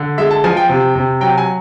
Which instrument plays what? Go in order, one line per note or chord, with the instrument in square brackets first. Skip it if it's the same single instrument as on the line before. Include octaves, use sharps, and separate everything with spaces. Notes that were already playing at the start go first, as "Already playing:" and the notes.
Already playing: [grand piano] D3
G#3 E5
A5
F3 G#5
G5
C3
C3
F#3 G5
G#5